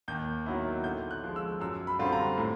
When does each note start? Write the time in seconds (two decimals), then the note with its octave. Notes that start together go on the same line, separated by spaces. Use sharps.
0.08 D#2 G6
0.46 D#3 F#3 B3 E4
0.84 D3 G6
1.11 F#6
1.23 F3 G#3
1.36 E6
1.60 F#2 E6
1.87 B5
1.99 D3 G3 C4 F4
2.06 B5
2.12 A#5
2.38 A2